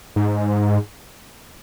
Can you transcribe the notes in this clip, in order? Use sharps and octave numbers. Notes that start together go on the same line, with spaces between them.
G#2